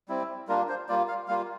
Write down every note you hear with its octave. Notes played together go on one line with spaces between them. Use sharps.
G3 C4 E4
G3 A#3 D4 F4 A#4
C5
G3 A#3 F4 D5
F5
G3 A#3 F4 F5